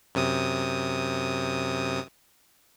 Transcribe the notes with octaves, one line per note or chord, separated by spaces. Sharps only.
F#2 C3 D#6